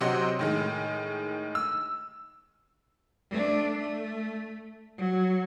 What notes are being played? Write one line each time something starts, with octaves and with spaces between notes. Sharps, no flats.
C3 F#3 C4 D#5 F#5 C6
A2 D#3 G#3
E6
A3 D4
A3
F#3